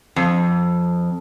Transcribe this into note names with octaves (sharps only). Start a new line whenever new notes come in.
F2